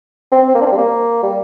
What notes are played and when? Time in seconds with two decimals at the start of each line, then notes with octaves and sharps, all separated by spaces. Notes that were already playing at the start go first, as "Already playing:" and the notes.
0.32 C4
0.48 C4
0.54 A#3
0.61 D4
0.66 C4
0.72 G3
0.77 A#3
1.23 G3